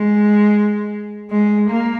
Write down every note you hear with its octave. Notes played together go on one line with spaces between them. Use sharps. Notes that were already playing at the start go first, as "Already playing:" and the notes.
Already playing: G#3
G#3
A#3